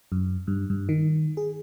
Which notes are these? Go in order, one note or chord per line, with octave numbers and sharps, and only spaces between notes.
F#2
G2
G2
D#3
G#4